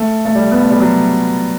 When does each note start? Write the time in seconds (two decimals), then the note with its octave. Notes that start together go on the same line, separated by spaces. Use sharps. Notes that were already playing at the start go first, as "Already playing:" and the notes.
Already playing: A3
0.25 A3
0.35 G3
0.51 B3
0.61 A3
0.70 G3
0.80 F#3